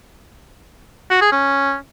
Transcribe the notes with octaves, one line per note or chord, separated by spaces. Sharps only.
F#4
G#4
C#4